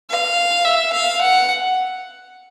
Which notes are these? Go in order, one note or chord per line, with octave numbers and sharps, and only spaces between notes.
F5
E5
F5
F#5